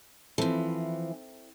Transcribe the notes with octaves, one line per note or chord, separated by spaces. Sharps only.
E3 F3 C4 E4 A4